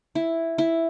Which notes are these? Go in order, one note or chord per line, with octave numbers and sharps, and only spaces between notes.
E4
E4